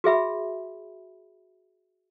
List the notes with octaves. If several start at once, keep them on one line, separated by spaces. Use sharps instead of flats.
F#4 G#4 E5 B5